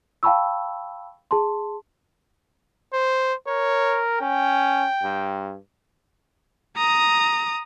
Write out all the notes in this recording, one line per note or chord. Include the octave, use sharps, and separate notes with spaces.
F5 G5 A5 B5 C#6 E6
G#4 A5 C6
C5
A#4 C#5
C#4 G5
G2
A#5 D#6